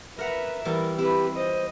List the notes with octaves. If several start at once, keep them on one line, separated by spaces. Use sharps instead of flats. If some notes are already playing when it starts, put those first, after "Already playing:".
A#4 B4 E5 F#5 A#5
E3 G3 B3 A#4
C4 E4 G4 B4
C5 D#5